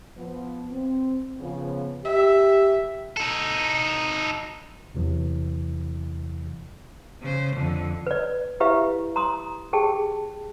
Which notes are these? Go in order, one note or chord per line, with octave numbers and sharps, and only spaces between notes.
F3 B3
C4
C#3 F3 B3
G4 E5
D#4 A4
E2 C3 E3 F#3
C#3 C5
F2 D3
B4 D5
E4 G4 B4 E5 F5
A#5 C6 D#6
G4 G#4 G5 A5